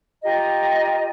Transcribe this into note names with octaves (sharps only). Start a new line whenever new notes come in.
F4 G4 D#5 A#5